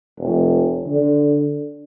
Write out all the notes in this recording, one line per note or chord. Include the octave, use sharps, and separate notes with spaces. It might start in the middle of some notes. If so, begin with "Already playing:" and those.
F1
D3